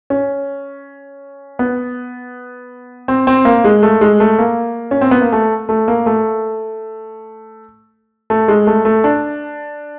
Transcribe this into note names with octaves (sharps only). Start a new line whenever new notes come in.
C#4
B3
C4
C4
A#3
G#3
A3
G#3
A3
A#3
C#4
C4
B3
A#3
A3
A3
A#3
A3
A3
G#3
A3
A3
D4